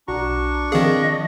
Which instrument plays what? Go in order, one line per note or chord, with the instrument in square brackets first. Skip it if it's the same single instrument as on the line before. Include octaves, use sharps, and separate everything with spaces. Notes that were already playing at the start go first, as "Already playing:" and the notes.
[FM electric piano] B1 F#4 A#5 [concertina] D4 C#6
[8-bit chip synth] D#3 G#4 [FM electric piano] F3 C4 F5 [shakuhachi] D#5